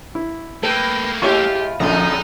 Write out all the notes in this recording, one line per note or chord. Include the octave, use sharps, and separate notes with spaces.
E4
A3 A#3 A4 B4 G5
G#3 E4 F4 G4 C#5 C#6
A#1 F2 A2 D3 G#3 D#5 A#5